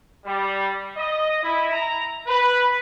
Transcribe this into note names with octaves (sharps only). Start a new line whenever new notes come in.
G3
D#5
E4
A#5
B4